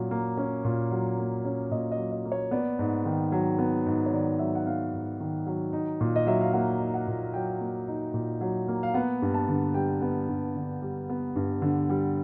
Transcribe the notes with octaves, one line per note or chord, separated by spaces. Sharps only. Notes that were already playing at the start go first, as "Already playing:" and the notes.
Already playing: A#2 F#3 C#4
A#3
C#4
A#2
F#3
A#3
C#4
A#2 D#5
D#5
F#3
D#5
A#3
C#5
B3 D5
G#2
D#3
F#3
B3
G#2
C#5
D#3 D5
F#3 E5
F#5
B3 F5
G#2
D#3
F#3
D#4
A#2
D#5
F#3 E5
F5
A#3 F#5
D#4
F#5
A#2
F#3 G5
A#3
D#4
A#2
F#3
A#3
F5
B3 F#5
G2
A5
D3
G3 G5
B3
G2
D3
G3
B3
G2
D3
G3